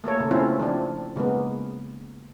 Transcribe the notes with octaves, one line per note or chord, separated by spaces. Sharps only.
A3 A#3 A4 C#5
C#3 A4
A3 C4 C#4 E4 F4
F3 C4 D4
C#3 G#3 A#3 B3